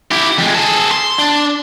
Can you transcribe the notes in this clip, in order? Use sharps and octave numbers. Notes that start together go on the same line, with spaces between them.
E4 G4
F2 G#3
G#4 A4
C6
D4